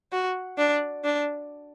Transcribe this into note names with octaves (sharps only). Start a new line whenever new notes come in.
F#4
D4
D4